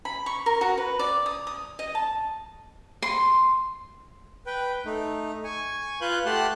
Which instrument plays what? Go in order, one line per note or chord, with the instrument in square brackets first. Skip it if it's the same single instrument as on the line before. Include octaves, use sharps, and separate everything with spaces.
[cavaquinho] B5
C#6
A#4
F#4
B4
D5
D#6
D#6
D#5
A5
C6
[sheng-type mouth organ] B4 G5
A3 D#4
G#5 C#6
F4 B4 F5 F#6 G6
A3 G4 F#5 A5 C6 F#6